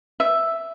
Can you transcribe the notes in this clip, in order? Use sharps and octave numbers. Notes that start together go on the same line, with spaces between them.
E5